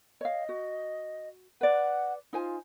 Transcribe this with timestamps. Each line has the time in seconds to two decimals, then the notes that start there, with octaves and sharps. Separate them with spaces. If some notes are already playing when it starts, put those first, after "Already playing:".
0.21 C#5 D#5 F5
0.49 F#4
1.61 B4 D5 F#5
2.33 D#4 F4 C5 G#5